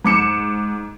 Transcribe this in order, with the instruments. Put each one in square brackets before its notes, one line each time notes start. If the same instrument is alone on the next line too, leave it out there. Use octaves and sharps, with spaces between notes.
[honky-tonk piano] G#2 D6 C#7 E7